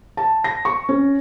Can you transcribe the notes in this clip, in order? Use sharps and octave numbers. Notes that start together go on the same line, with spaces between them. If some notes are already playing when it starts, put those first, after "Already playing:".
A5
A#6
C#6
C#4